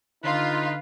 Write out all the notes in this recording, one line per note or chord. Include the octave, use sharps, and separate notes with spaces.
D3 D#4 F4 B4